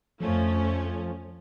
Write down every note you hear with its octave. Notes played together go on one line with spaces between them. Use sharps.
F2 F3 A3 C#4